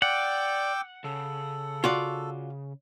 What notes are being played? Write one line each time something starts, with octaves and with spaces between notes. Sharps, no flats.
D5 F#5 G5 D6 E6
C#3 A4
F4 F#4 D5